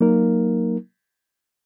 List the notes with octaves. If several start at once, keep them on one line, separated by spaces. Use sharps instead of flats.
F#3 A#3 D#4 A#4